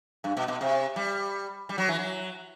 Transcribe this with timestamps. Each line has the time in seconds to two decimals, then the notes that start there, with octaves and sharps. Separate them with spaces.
0.24 G2
0.37 B2
0.48 B2
0.61 C3
0.96 G3
1.69 G3
1.78 F#3
1.88 E3
1.99 F#3